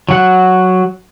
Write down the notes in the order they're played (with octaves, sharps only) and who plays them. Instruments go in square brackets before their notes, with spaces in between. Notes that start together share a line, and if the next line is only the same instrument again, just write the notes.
[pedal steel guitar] F#3 F#5